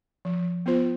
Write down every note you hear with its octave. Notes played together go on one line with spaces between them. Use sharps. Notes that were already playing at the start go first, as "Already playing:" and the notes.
F3
B3 F4 C5